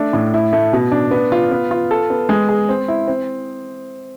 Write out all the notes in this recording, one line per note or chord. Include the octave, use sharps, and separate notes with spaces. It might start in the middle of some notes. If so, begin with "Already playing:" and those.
Already playing: A3 D4
A2
E4
A3
B2
D4
B3
F4
B3
F4
A4
B3
G#3
G#4
C4
E4
C4